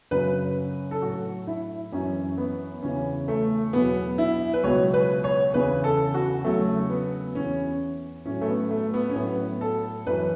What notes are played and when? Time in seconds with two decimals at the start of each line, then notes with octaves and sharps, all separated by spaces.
0.11 F#2 C#3 F#3 B4
0.91 A4
1.01 A2 F#3 F#4
1.47 E4
1.92 F#2 E3 C#4
2.38 B3
2.83 E2 C#3 E3 C#4
3.28 A3
3.73 E2 B2 F#3 B3
4.18 E4
4.54 B4
4.63 C#2 B2 F#3 C#5
4.94 B4
5.24 C#5
5.54 E2 C#3 E3 B4
5.84 A4
6.14 F#4
6.44 E2 C#3 F#3 A3
6.90 B3
7.35 E2 E3 C#4
8.26 A2 F#3 C#4
8.41 A3
8.48 B3
8.71 A3
8.94 B3
9.10 C#4
9.16 A2 F#3 B3
9.61 A4
10.06 F#2 E3 B4